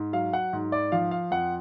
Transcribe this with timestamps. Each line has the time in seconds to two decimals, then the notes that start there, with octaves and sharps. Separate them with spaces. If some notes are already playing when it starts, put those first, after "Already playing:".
Already playing: G#2
0.13 F#3 F5
0.33 F#5
0.53 G#2
0.72 D5
0.92 F3 F5
1.11 F5
1.31 F2 F#5